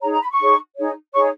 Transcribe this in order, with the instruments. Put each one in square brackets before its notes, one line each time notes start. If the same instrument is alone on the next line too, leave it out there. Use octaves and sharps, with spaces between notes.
[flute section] D#4 G#4 C#5 A#5
A#5
B5
C#6
D#4 G#4 C#5
D#4 G#4 C#5
D#4 G#4 C#5 C#6